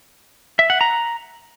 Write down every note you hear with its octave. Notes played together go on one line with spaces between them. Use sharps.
E5
F#5
A#5